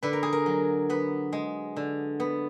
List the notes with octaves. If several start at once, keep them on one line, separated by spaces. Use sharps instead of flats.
D3 B4
A#4
G#4
A#4
F#3
B3 B4
G#3
D3
B3